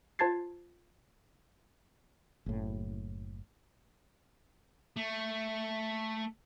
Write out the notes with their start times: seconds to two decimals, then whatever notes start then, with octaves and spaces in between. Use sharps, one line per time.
0.19 F4 C5 A5 G#6 A6 C7
2.46 F#1 A2
4.97 A3